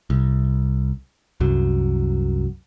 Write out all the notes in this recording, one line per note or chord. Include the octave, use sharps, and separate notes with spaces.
C2
C2 F#2 F#3